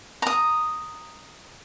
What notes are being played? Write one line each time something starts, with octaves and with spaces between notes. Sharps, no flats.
A#5 D#6